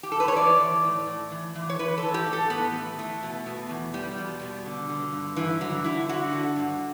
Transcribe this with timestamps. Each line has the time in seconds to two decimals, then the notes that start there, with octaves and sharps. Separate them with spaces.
0.03 G4
0.12 A4
0.20 B4
0.28 C#5
0.35 E3 D5
0.60 E3
0.84 A2
1.07 A2
1.31 E3
1.55 E3
1.70 C#5
1.79 E3 B4
1.98 A4
2.03 E3
2.14 G4
2.27 A2
2.33 A4
2.50 A2 B3
2.74 E3
2.98 E3 A3
3.23 B2
3.46 B2
3.69 E2
3.93 E2 G3
4.18 B2
4.41 B2
4.66 D3
4.89 D3
5.13 G2
5.36 G2 E3
5.61 D3 F#3
5.84 D3 E4
6.09 D3 F#4
6.33 D3
6.56 G2